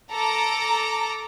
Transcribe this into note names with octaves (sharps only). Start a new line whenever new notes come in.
A4 A#5 D6